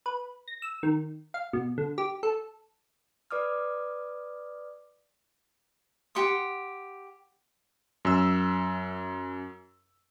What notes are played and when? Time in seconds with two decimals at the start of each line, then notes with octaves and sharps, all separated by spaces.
0.06 B4
0.48 A#6
0.62 E6
0.83 D#3
1.34 F5
1.53 B2
1.78 D3
1.98 G4
2.23 A4
3.31 B4 D5 D6 D#6 F6
6.15 G4 F#5 C6 D#6
8.05 F#2 E6